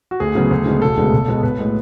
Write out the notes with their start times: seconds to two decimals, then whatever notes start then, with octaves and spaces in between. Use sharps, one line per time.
0.11 F#4
0.20 D2 G#4
0.35 C#3 F#3 B3
0.51 D2
0.66 C#3 G#3 B3
0.82 E1 A4
0.97 D2 C#3 G#3 B3
1.13 B1
1.28 B2 G#3 B3
1.43 B1 B4
1.59 A2 G#3